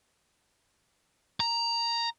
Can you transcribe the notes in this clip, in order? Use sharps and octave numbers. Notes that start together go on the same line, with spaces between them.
A#5